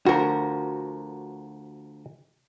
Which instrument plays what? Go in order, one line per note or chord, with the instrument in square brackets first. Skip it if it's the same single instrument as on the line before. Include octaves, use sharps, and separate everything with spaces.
[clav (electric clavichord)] D2 F3 [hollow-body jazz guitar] F#4 A#4